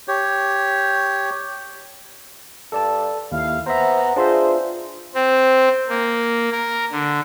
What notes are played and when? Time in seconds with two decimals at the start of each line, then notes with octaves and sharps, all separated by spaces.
0.08 G4 C#5
2.72 G2 A4 D5 A5
3.32 D#2 E4 F5
3.66 B3 C5 E5 A#5
4.16 D4 F4 G#4 C5 E5
5.15 C4
5.89 A#3
6.52 A#4
6.91 D3